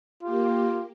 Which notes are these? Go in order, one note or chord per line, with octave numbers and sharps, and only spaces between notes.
A#3 F4 G4